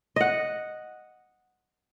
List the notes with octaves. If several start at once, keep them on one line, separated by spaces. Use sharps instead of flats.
D#5 F#5